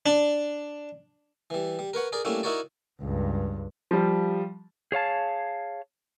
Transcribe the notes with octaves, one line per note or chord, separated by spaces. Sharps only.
D4
E3 G3
G3
A#4 B4 C#5 F#5
G#4 A#4 D5
G3 A3 A#3 C#4 D4 E4
D#4 E4 F#4 A#4 C#5 D5
C#2 G2
F3 G3
G#4 C#5 F5 A5